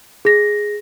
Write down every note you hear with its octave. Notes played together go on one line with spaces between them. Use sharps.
G#4 A#6